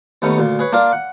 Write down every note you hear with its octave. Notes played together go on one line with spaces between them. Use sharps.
D#2 A3 B3 C#4 D#4
D2 A#2
G#4 B4 C#5
A#3 D4 F4 A#4 D5
F#5